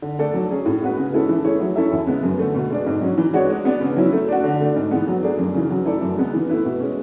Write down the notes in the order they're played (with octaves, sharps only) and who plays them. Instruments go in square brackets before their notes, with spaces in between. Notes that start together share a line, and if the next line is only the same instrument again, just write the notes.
[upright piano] D3
A3 D4 A4
F#3
C#4 G#4
A2
G#3 B3 F#4 B4
C#3
G#3 C#4 E4 A4
E3
A3 E4 G#4 C#5
F#3
C#4 E4 A4 E5
E2
C#3 G#3 B3
F#2
D3 A3
B2
G#3 D4 G#4
G#2
F#3 C#4
E3
G#3 D4 F#4 C#5
G#3
B3 D4
C#3
F#3 C#4 E4
A3
D4 F#4
D3
A3 D4
G#2
E3 G#3 B3
F#3
A3 D4 G#4
F#2
C#3 E3
F#3
A3 E4 A4 D5
F#2
C#3 G#3 B3
E3
A3 E4 B4
B2
G#3 C#4